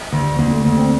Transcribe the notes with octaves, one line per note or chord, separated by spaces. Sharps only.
D2
D2 A#3
A3
D2
C4